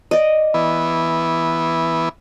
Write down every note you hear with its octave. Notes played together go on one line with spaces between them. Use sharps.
D5 D#5
E3 B3